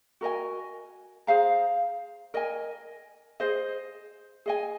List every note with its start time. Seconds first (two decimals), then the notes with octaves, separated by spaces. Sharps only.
0.21 F#4 A#4 D#5 G#5
1.27 G#4 C5 F5 A#5
2.34 A#4 D#5 G#5
3.40 G#4 C5 D#5
4.46 G#4 D#5 G#5